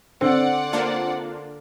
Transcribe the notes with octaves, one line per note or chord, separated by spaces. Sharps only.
D3 C4 D5 F#5
A#3 D4 F4